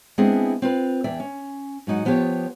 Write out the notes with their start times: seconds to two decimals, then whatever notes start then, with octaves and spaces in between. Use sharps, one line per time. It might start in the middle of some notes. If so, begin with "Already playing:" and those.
0.18 G#3 B3 C4 D4 E4 G#4
0.62 C4 F4 B4
1.04 E2 D5 E5 G5
1.20 C#4
1.87 G#2 F#3 D#4 F#5
2.05 F3 B3 F4 G4 C#5